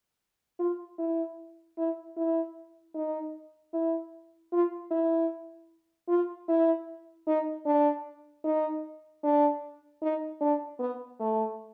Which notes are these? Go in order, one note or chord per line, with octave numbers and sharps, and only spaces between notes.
F4
E4
E4
E4
D#4
E4
F4
E4
F4
E4
D#4
D4
D#4
D4
D#4
D4
B3
A3